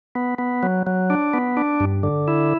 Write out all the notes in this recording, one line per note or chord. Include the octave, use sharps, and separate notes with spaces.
B3
B3
F#3
F#3
D4
B3
D4
G2
D3
E4